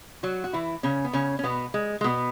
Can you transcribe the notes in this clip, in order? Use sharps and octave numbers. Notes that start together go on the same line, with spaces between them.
F#3 F#4
F#4
E3 E4
C#3 C#4
B3
C#3 C#4
C#4
B2 B3
G#3
G#3
B2 B3